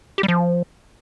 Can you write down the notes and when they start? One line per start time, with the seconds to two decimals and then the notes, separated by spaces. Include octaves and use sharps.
0.18 G4
0.23 G3
0.28 F3